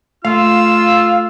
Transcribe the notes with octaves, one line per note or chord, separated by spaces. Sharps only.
A3 F4 F5 E6